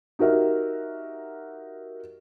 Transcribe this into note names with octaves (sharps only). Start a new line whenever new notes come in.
D#4 F#4 G4 A#4 E5